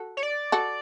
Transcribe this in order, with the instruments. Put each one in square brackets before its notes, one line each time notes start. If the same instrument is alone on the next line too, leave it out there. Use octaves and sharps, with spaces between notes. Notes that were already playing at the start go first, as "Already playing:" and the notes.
Already playing: [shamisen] F#4 A4
[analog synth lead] C#5
D5
[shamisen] F#4 A4